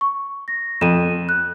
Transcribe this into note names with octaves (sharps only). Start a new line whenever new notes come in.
C#6
A#6
F2 D#7 E7
F#6